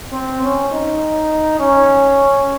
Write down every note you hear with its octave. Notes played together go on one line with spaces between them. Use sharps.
C4
C#4
D#4
C#4